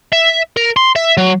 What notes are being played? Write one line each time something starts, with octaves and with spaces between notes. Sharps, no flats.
E5
A#4
C6
E5
F#3